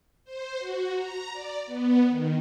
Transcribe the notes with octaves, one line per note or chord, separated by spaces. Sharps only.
C5
F#4
A#5
D5
B3
D#3